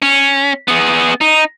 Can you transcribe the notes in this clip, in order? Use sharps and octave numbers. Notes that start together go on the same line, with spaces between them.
C#4
B3 G#4
D#4